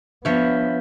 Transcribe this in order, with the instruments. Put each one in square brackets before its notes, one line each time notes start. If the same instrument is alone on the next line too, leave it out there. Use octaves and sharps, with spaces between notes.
[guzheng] F3 C#5 [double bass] B3 [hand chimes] D4 E5 B6